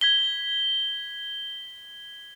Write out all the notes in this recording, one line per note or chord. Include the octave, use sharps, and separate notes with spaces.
G#6 B6 G7